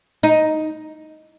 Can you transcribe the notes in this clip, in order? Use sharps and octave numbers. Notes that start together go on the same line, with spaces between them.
D#4